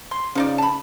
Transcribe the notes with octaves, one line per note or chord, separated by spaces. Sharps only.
C6
C#3 F3 D#4 D5
A5 B5